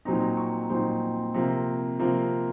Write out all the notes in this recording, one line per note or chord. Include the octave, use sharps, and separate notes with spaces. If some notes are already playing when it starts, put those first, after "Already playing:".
A#2 F#3 C4 D#4 A#5
C#6
A#2 F#3 C4 D#4 C6
C3 F3 A#3
C3 F3 A#3